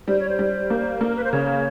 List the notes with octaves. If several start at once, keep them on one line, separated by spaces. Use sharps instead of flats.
G3 C5
C#5
C5
G3
A#3
A#3 A4
A#4
B4
C5
C#3 C#5